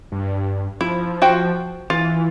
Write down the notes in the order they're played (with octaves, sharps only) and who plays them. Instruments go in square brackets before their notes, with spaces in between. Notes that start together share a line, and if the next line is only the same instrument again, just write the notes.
[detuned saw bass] G2
[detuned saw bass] F3 [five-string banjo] E4
[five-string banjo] F#4 C5 G5
[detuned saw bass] E3 [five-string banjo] F4